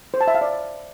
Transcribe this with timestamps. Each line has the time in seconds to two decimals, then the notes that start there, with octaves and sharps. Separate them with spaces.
0.14 C5
0.21 A5
0.28 E5
0.34 F5
0.41 D5